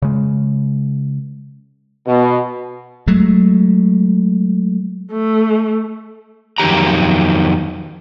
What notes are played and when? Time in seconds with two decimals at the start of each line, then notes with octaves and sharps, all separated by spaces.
0.02 C#3 G#3
2.07 B2
3.07 F#3 G#3 A3
5.12 A3
6.58 F2 D#3 F#3 G4 A#5